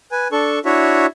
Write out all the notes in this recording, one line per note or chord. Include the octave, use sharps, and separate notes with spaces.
B4 G#5
D4 A4 C#6
D4 E4 F#4 C#5 E5